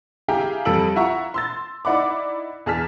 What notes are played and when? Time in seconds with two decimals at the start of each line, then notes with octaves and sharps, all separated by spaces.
0.28 E4 G4 G#4 F5 G5 A#5
0.65 F2 G3 A4 E6 D7 F#7
0.96 E4 F4 E5 F#5 A#5 C#6
1.34 C6 E6 A6
1.85 D#4 E4 D5 F#5 B5 D6
2.66 E2 G#4 A5 F6 B6